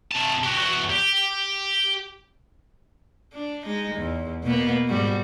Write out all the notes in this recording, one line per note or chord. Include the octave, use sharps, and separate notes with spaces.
C3 A5
F#4 G4
E2 F#4
G4
D4
G#3 D#4
E2
B2 A#3 B3
G#2 G3 F#4